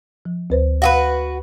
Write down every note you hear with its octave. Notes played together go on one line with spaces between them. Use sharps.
F3
D2 B4 C5
F#4 G#4 B4 F5